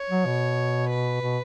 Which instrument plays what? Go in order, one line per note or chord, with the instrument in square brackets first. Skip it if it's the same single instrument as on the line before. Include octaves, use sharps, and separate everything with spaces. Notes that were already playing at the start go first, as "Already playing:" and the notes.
Already playing: [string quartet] C#5
[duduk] F#3
B2
[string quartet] B4
[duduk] B2